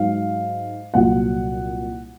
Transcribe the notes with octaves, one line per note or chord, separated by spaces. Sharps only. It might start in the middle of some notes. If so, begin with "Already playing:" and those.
Already playing: G#2 F#3 F5
C2 A#2 F#3 F#5